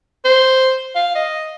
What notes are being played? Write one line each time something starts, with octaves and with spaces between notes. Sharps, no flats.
C5
F5
D#5